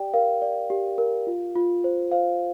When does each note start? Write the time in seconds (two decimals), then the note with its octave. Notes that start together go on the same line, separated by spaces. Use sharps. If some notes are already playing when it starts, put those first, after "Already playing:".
Already playing: G4 D5 G5
0.14 A#4 F5
0.42 D5
0.70 G4
0.98 A#4
1.27 F4
1.55 F4
1.84 C5
2.11 C5 F5